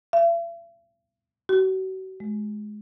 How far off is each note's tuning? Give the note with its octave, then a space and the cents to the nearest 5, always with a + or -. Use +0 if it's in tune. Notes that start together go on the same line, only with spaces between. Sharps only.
E5 +45
F#4 +35
G#3 +25